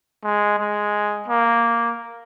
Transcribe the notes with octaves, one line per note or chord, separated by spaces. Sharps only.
G#3
G#3
A#3